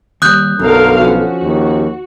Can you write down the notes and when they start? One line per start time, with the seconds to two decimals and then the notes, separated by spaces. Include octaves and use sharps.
0.22 D#2 G3 D#6 F#6 G6
0.59 B1 F#2 D3 A#4 F5
1.01 F3 C#4 F#4
1.42 D#2